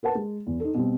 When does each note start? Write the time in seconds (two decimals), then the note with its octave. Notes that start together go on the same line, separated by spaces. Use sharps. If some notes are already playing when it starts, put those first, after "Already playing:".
0.03 A#4 B4 F#5 A5
0.15 G#3
0.47 E2
0.60 D#4 A4
0.74 B2 G3 C4